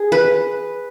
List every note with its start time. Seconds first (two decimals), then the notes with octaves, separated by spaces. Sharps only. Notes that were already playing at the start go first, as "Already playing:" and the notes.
Already playing: G#4
0.12 B4